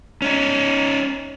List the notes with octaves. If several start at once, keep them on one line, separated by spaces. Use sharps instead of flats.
C#4 D#4